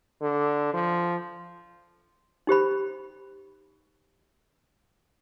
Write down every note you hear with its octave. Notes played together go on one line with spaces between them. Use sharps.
D3
F3
D#4 G4 C5 B5